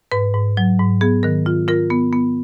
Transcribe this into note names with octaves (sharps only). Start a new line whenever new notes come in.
G#2 B4
G#2
F#3
G#2
B3 G#4
D#3 A#4
F4
F4 A#4
B3
B3